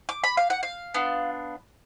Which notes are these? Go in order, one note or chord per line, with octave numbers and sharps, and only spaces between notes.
D6
B5
F5
F#5
F5
B3 D4 F4